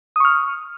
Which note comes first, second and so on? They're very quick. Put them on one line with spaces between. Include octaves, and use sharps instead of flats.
D#6 C#6 F6